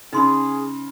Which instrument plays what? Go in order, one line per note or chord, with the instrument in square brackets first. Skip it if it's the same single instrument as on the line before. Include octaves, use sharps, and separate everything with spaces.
[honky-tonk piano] C#3 [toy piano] D#4 C6 [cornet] G#4